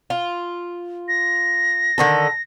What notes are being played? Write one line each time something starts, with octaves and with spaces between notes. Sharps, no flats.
F4
A#6
D3 D#3 A4